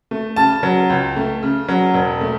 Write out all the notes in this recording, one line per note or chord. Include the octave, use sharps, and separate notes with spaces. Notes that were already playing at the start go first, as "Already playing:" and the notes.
A3
C#3 A5
F#3
C#2
A3
C#3
F#3
E1
A3